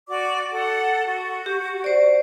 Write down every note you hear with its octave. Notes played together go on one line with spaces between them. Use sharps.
F#4 D5 D6
A4 F#5 A5
F#4
G4
C5 D5